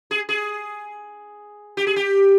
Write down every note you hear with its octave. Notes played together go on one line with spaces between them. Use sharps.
G#4
G#4
G4
G#4
G4